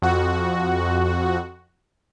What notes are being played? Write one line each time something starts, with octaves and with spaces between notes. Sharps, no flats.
F2 F#4